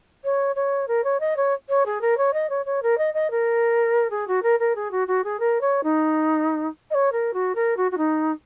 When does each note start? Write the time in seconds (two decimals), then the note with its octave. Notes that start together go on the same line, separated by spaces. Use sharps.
0.24 C#5
0.56 C#5
0.88 A#4
1.04 C#5
1.20 D#5
1.37 C#5
1.69 C#5
1.86 G#4
2.01 A#4
2.17 C#5
2.33 D#5
2.49 C#5
2.66 C#5
2.83 A#4
2.98 D#5
3.14 D#5
3.31 A#4
4.10 G#4
4.28 F#4
4.43 A#4
4.60 A#4
4.75 G#4
4.91 F#4
5.07 F#4
5.24 G#4
5.40 A#4
5.61 C#5
5.84 D#4
6.90 D#5
6.94 C#5
7.12 A#4
7.33 F#4
7.55 A#4
7.77 F#4
7.91 F#4
7.98 D#4